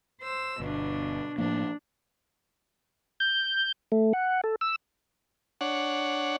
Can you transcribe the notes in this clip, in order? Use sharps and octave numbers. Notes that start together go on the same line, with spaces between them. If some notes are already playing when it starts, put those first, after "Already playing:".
C5 E6
G1 B2 D4
A2 F3 A#3 D4
G6
A3
F#5
A4
E6
D4 C#5 F#5